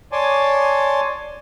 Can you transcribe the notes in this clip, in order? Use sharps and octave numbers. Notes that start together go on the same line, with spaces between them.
C#5 D5 G#5 A5 C6 D6